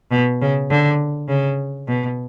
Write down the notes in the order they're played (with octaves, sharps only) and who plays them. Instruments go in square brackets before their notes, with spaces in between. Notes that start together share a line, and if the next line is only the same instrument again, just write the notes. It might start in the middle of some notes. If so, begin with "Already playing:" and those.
[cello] B2
C#3
D3
C#3
B2